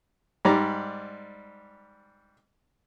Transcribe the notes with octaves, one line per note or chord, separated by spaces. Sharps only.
G#2 G3 D5 A#5